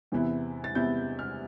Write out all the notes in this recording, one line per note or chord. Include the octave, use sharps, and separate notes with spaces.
E2 C3 E3 B3 E4
A6
E2 C3 E3 B3 E4 G6
F6